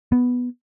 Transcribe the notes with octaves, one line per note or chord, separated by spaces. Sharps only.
B3